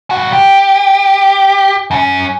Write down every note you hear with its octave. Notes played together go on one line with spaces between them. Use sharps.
G2 F#4
G4
F#2 C#4